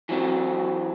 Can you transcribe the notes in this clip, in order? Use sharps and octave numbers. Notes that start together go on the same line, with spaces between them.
E3 F#3 C4